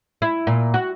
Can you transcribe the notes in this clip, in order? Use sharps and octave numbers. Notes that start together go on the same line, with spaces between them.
E4
A#2
F#4